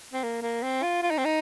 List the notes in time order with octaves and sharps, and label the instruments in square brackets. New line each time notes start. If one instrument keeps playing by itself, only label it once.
[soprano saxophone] C4
A#3
A#3
C4
F4
F4
D#4
C4
D#4